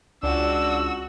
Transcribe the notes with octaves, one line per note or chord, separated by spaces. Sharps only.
C#2 D4 F#4 E6